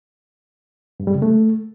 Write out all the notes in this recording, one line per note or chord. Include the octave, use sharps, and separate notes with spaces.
G2
G3
C#3
A3